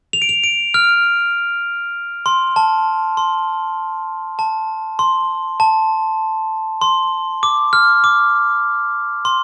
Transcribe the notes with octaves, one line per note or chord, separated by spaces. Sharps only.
F7
D7
F7
D7
F6
C6
A5
C6
A5
C6
A5
C6
D6
F6
D6
C6